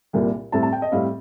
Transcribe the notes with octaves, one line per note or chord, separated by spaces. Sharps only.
C2 A#2 G3 A#3
A2 G3 C4 A5
A5
G5
D#5
A2 G3 C4 F5